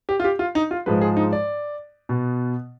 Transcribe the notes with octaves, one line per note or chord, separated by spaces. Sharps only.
G4
F4
G4
F4
D#4
F4
G#2 F3 G#3 B4
G#4
D#4
D5
B2 B3